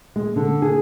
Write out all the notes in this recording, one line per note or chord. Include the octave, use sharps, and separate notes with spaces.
G#3
D3
G#4